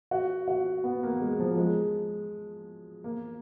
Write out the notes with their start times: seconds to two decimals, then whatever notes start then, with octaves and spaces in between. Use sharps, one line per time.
0.11 F#4
0.48 F#4
0.84 B3
1.03 A#3
1.21 G#3
1.39 F3
1.58 G#3
3.04 A#3